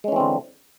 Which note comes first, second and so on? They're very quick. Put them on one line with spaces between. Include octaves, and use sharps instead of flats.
G#3 C#4 E3 C4 D3